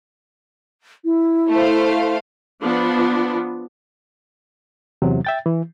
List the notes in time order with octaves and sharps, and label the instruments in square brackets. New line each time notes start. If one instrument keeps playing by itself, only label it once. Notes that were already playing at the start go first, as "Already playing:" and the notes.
[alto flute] E4
[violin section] A3 C5 F5
[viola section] F3 B3 D4
[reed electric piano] E2 C3 F#3
E5 G5 A6
E3